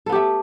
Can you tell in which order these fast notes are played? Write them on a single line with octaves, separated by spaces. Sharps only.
A4 B3 G4 A3